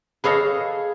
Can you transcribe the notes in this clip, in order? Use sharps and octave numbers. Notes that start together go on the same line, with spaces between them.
G#4 A4 B4 C#5 D#5 F5